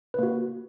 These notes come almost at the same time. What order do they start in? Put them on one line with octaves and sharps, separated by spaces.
B4 A#3 F#4